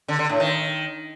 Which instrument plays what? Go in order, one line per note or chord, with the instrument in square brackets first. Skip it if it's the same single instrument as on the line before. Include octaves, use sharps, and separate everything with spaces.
[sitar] D3
D3
A2
D#3